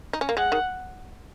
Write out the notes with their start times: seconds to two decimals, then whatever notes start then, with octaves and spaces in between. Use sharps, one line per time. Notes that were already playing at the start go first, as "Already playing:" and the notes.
0.13 D#4
0.21 C#4
0.29 A#3
0.37 G#3 F#5
0.52 D#3